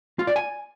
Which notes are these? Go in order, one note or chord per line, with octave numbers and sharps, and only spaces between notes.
F4
D5
G#5